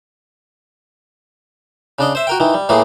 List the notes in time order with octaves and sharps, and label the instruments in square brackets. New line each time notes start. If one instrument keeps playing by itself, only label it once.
[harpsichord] C#3 D4 D#5
C5 E5
F#4 A#4 G5
D#3 E3
G3
A2 E3 A3 A#3 G#4